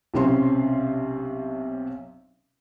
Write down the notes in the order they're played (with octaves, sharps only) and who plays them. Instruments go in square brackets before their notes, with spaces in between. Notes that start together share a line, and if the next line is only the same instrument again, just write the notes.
[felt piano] B1 C3 C4 C#4 C6